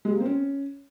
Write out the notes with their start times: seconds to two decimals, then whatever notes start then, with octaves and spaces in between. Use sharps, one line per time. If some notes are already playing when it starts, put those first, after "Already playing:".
0.05 G#3
0.10 G3
0.15 A#3
0.20 C4
0.26 C#4